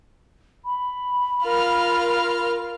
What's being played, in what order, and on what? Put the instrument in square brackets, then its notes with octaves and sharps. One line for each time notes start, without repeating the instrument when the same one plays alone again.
[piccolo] B5
[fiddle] F4 F6 [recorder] A#4